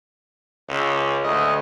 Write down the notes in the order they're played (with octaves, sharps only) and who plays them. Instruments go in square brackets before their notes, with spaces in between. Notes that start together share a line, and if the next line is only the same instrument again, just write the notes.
[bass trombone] C#2
[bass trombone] D2 [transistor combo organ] D#5